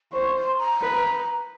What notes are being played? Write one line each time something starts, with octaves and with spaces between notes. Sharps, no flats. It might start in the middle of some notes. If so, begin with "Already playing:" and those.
C5 C#6
C6
A#5
B4